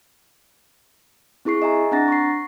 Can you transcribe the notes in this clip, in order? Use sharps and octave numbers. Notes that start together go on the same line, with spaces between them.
C4 E4 G#4 C#6 C7
D#5 E5 G#5 A#5
C4 D4 F#5 A#5 A6 A#6
C#6 C7